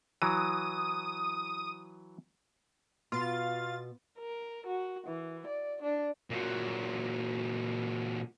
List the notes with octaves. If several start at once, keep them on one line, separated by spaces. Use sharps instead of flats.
E3 F#3 D#6
B2 F4 A6
A#4
F#4
E3
D5
D4
A#2 F#3